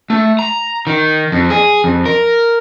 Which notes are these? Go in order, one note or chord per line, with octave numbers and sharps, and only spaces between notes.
A3
A#5
D#3
F2
G#4
F2
A#4